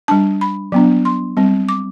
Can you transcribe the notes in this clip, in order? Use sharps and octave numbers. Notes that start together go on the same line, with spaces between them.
G3 D4 A5
B5
F#3 B3 D4
C6
G3 C4
D6